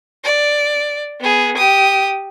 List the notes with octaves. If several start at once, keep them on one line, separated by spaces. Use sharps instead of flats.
D5
B3 G#4
G4 D#6